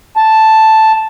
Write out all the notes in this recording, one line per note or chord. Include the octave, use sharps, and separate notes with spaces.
A5